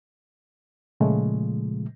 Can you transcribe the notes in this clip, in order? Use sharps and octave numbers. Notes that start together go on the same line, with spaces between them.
A#2 C#3 F3 G#3 A3